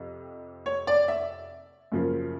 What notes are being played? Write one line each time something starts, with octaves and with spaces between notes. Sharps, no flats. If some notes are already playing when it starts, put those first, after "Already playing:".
Already playing: F2 C3
C#5
D5
E5
F#2 C#3 F3 A#3